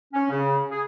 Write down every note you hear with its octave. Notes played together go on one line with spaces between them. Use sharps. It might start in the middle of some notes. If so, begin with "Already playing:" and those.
C#4
C#3
G#4